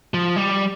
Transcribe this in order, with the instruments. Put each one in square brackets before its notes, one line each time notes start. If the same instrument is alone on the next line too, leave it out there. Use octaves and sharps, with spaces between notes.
[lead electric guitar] F3
G3